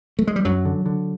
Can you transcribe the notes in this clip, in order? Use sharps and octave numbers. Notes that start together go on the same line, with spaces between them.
A3
G#3
G3
F#2 F#3
D3
D3